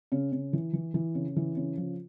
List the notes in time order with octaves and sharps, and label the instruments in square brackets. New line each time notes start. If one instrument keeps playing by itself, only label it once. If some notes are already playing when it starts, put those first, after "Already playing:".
[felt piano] C#3
C#3
E3
E3
E3
C#3
E3
C#3
F3